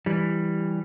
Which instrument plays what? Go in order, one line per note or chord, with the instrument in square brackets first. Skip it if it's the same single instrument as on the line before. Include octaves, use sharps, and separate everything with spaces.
[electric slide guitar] E3 G3